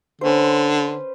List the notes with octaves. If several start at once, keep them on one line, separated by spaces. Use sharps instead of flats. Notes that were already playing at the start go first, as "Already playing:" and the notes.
D3 C#4 B4 C5